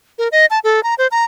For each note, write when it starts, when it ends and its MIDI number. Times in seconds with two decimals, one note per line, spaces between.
0.18 0.28 70
0.32 0.46 75
0.51 0.59 81
0.64 0.83 69
0.83 0.94 82
0.98 1.07 72
1.11 1.24 82